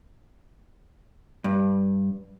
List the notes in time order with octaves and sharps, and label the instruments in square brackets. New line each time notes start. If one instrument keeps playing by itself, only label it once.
[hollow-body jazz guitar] G2